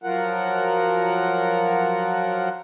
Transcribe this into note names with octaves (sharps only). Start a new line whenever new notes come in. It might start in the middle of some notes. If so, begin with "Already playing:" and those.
F3 F#3 F4 A#4 F#5